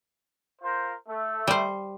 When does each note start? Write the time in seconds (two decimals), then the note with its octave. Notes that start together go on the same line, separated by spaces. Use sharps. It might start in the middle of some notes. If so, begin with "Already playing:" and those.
0.61 F4 A#4 C5
1.08 A3
1.47 G3 C5